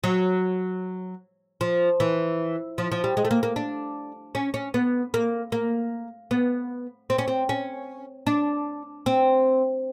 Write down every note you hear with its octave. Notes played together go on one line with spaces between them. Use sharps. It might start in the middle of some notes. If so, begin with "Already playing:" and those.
F#3
F3
E3
F3
F3
G3
G#3
A3
A#3
A#3
D4
C#4
C#4
B3
A#3
A#3
B3
C4
C#4
C4
C#4
D4
C4